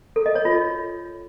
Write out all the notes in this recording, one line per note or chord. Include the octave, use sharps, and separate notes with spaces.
A4
D#5
C#5
F4